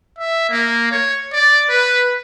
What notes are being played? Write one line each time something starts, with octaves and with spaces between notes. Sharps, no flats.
E5
A#3
C#5
D5
B4